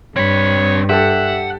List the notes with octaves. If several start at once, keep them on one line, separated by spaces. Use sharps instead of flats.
G2 C4 C#5 B5
G4 A4 E5 F#5